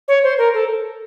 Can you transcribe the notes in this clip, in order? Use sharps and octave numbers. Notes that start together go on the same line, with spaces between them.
C#5
C5
A#4
A4